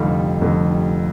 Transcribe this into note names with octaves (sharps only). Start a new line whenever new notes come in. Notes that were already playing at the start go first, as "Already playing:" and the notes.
Already playing: F1 F2 D3 G3 D#4 F4
F1 F2 D3 G3